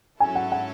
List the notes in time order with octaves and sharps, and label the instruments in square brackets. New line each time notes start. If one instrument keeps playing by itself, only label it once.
[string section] G#2 F#3 C#4 E4 A4 [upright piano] G#5
[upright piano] F#5
F#5